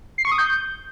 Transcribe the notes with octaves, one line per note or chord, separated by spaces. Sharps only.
C7
C#6
D#6
G6